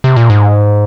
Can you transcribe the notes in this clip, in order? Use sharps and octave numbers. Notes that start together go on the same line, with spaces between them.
C3
A#2
G#2